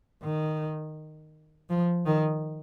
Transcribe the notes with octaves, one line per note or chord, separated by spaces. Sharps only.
D#3
F3
D#3